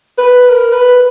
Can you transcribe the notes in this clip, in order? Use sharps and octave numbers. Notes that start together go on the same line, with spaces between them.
B4
A#4
B4